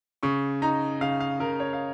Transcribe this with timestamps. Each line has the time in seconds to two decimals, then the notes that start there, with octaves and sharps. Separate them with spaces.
0.23 C#3 C#6
0.62 D#4 A#5
1.01 C#3 F5
1.20 F5
1.40 C#3 A#4
1.60 C#5
1.73 F5